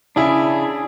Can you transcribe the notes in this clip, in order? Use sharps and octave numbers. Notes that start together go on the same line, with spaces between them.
C#3 D4 E4 G#4